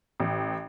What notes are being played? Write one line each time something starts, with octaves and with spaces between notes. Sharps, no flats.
A1